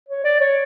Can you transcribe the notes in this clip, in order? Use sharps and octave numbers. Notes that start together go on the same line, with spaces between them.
C#5
D5
C#5